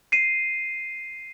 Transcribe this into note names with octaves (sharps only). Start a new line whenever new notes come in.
C7 D#7